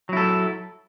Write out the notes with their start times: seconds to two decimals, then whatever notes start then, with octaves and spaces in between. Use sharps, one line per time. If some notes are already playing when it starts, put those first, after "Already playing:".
0.09 F#3
0.13 E4
0.17 A4